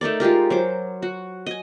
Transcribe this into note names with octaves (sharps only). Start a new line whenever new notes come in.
A3 D#4 A#4 D5
G#3 F4 G4 A#4
F#3 C5 D6
F#4
D#5 G#5